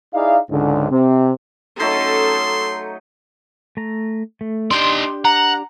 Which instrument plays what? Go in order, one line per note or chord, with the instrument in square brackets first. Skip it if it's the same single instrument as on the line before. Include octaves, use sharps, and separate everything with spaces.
[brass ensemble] D#4 E4 G#4 D5 F5
C#2 G#2 D3
C3 C4
[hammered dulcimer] F#3 A3 D#4 [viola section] C#4 A4 [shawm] C6
[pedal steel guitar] A3 A#5
A3
[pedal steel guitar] D4 G4 [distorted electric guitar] D#4 D5 [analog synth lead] C6
[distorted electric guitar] F#5 [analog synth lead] A#5